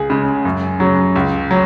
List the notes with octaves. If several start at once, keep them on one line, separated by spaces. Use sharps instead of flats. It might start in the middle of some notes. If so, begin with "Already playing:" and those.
Already playing: C#2 G#4
C#3 G#3
F#2
C#3 F#3
C#2
F#3